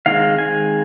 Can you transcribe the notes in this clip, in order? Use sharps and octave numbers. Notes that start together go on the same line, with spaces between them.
D#3 G#3 C4 F5
G#5